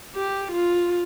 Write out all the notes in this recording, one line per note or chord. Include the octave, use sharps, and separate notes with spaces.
G4
F4